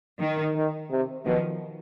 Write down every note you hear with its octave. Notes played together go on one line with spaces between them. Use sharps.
D#3
D#3
C3
B2 D#3 F3